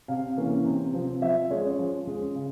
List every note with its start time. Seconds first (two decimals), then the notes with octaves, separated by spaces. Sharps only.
0.08 C3 F5
0.37 E3 A#3 C#4
0.65 C3
0.94 F3 C4
1.22 F3 E5
1.51 G#3 C#4 C#5
1.79 F3
2.07 G#3 C#4
2.35 C#3